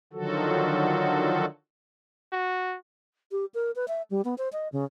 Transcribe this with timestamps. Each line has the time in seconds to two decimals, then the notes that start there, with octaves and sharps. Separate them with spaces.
0.13 D3 D#3 F3 F#3 F#4 A4
2.32 F#4
3.31 G4
3.54 A#4
3.76 B4
3.88 E5
4.10 G3
4.25 B3
4.38 C5
4.52 D#5
4.72 C#3